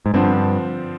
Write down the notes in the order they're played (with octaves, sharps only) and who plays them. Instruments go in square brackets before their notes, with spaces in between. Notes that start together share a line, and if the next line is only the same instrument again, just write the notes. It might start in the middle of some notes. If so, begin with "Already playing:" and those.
[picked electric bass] G#2
[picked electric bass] G2 [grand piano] D3 F3 C4